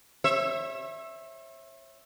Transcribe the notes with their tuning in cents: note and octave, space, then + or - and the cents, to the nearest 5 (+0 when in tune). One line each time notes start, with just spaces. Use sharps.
C#5 -40 E5 +0